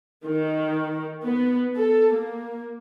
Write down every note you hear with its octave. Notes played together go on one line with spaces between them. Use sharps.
D#3
B3
A4
A#3